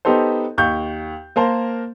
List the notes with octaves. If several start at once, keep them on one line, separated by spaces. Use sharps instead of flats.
B3 D#4 G4 A4 C5
D#2 C#6 G6
A#3 A#4 C5 A5